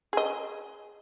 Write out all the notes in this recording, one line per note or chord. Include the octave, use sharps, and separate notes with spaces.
G#4 D#5